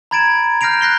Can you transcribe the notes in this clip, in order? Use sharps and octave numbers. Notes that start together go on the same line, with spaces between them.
A#5 B5 G#6 A6 D7 E7
F6 G6 A#6 C7 D7 F7
F#6 A#6 C7 G7